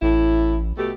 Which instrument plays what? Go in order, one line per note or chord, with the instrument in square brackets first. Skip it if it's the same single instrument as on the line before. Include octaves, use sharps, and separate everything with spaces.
[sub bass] A1 [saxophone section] A2 E4
[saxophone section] B2 A3 G4